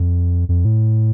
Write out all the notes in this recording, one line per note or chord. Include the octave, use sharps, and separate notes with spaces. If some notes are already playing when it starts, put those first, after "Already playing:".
Already playing: F2
F2
A2